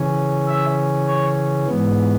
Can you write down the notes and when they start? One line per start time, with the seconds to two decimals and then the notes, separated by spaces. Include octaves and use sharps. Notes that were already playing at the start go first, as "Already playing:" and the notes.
Already playing: C#3 E3 C#4
0.47 E5
1.07 C#5
1.67 G#2 E3 B3